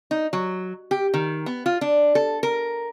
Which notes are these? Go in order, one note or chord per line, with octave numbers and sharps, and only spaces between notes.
D#4
F#3
G4
D#3
B3
F4
D4
A4
A#4